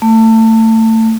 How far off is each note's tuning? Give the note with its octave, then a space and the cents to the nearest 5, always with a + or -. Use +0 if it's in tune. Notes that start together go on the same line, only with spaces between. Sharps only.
A3 +25